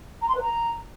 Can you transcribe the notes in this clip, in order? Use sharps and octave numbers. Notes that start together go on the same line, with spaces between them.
A#5
C6
B4
A#5